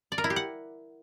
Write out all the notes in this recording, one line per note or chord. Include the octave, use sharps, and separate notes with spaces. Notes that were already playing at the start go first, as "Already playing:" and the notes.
D5
A#4
E4
G4
F#5